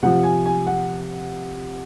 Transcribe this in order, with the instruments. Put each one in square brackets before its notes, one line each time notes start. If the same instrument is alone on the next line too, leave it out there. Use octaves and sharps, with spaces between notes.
[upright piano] C3 F3 F#5
G#5
G#5
F#5